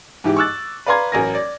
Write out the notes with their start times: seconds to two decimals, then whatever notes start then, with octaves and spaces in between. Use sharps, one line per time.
0.24 G#2 E3 G4
0.37 C#6 D6 E6 F#6 A6
0.86 B4 D5 F5 A#5 C6 G#6
1.12 A1 F#3 A#4 G#5 A#6
1.35 D5